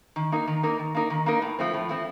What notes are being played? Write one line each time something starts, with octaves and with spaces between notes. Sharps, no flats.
D#3
A#3 D#4 A#4
D#3
A#3 D#4 A#4
D#3
A#3 D#4 A#4
D#3
A#3 D#4 A#4
A2
F3 A3 C4
A2
F3 A3 C4